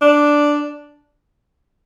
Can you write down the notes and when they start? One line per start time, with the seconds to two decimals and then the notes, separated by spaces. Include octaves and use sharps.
0.02 D4